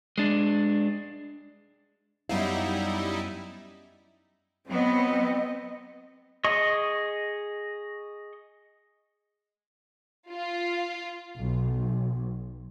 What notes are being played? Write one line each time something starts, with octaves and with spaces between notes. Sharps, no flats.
G#3 D4
F#2 G3 B3 D#4 E4 F5
F#3 B3 C4 D#5
G#4 D#5 C#6
F4
B1